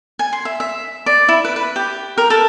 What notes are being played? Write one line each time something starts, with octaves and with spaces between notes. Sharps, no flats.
G#5
C6
E5
E5
D5
E4
B4
B4
G4
A#4
A4